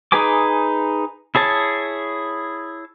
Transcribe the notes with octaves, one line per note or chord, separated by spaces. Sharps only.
D#4 G#4 B4 G#5 D6
E4 G#4 C#5 A5